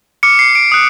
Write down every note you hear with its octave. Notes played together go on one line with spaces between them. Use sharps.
D6 F6 C#7
C7
D7
D#6 F#6